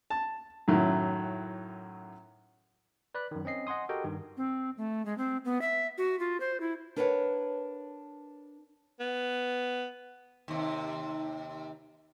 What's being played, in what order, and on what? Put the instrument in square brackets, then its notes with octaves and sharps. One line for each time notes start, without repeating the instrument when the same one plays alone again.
[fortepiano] A5
F#2 A2 D#3 F#3 E4
[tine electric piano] B4 D5 B5 F#6
F#2 D#3
C4 C#4 D#5 C7
D#5 F#5 G#5 C6 D#6
F#4 G4 A4 A#4 D#5 G5
G2 D#3
[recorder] C4
A3
G#3
C4
B3
E5
F#4
F4
C5
E4
[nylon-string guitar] D4 A#4 B4 C#5 D#5 F#5
[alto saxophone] B3
[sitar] D#2 C3